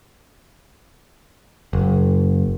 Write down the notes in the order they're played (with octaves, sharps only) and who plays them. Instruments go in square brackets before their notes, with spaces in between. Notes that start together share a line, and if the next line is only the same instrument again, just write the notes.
[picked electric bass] F#1